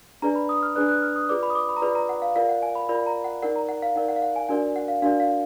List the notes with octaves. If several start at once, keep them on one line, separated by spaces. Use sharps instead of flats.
D4 G#4 B4 D5 A#5
B5
D#6
F6
D4 G#4 B4 D5 F#6
F#6
F6
D#6
F4 G#4 B4 D5 D6
B5
D#6
D6
B5
A#5
F4 G#4 B4 D5 B5
A#5
F#5
F5
F4 A#4 D5 F5
F#5
G#5
B5
F4 A#4 D5 B5
A#5
F#5
D#4 A#4 D5 F#5
A#5
F#5
F5
D#4 A#4 D5 F#5
F#5
F5
F#5
G#5
D4 F#4 A#4 D5 G#5
F#5
F5
D4 F#4 A#4 D5 F5
F5